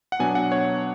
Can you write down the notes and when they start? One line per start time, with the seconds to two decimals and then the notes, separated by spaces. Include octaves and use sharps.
0.12 F#5
0.19 B2 F#3 B3 D4 G#5
0.35 F#5
0.52 C#5